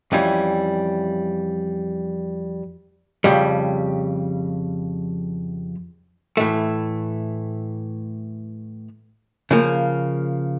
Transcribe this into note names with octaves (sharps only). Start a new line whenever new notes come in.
F2 E3 G3 C#4
F2 C#3 G3
A2 E3 A3
C#3 F3 A#3